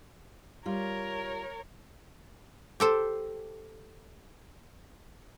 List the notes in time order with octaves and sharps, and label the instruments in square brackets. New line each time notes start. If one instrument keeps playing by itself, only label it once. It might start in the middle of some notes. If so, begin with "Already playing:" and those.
[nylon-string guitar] G3 F4 [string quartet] A#4 C#5
[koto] G4 A4 C5